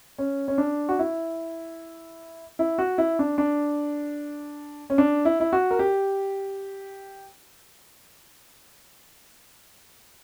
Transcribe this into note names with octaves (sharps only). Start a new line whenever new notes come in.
C#4
C#4
D4
F#4
E4
E4
F#4
E4
D4
D4
C#4
D4
E4
E4
F#4
A#4
G4